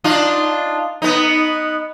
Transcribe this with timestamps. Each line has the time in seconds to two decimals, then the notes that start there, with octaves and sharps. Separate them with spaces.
0.04 D4 D#4 F4
1.02 B3 D#4